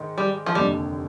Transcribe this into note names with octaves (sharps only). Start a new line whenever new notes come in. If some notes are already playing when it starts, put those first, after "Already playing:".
Already playing: G#2 D#3
G3
F3
F1 D#2 D3 G3